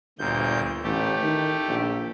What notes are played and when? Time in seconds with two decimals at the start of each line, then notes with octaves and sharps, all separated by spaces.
0.19 G1 D2 A#2 G6
0.83 A1 A3 G4
1.23 D#3
1.68 A#1